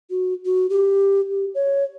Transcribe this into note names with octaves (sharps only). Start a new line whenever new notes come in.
F#4
F#4
G4
G4
C#5